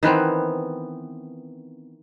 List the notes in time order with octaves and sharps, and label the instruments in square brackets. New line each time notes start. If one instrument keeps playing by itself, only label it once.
[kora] D#3 E3 B3 C4